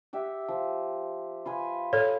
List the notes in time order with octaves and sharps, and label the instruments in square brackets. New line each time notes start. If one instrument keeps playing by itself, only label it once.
[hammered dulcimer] G4 E5 F#5
F3
F4 B4 G#5
[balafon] A4 C#5